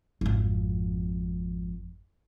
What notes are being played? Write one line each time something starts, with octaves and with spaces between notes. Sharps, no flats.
G#1 F2